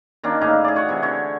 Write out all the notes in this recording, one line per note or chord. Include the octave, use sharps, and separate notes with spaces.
D#3 A#3 C#4 D4
A2 D#4 G#4 F5
G#4 D5
C#5 F#5 C#6
C3 E3
D3 C#5